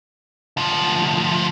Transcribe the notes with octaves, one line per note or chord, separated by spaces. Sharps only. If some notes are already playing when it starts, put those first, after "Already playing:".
D2 F3